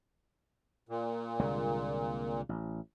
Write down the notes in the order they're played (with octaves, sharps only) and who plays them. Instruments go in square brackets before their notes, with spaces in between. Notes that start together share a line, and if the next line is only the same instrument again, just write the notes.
[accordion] A#2
[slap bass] C2 D3 G#3
A1